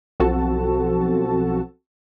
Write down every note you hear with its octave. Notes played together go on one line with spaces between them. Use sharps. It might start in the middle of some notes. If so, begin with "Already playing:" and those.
B1 F3 C4 F#4 A4 A5